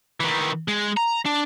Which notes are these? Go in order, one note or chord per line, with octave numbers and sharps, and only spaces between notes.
D#3 E3
G#3
A#5
D4